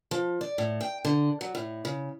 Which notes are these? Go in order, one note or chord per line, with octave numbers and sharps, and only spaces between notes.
F3
D5
A2
G5
D3
F#3
A2
C#3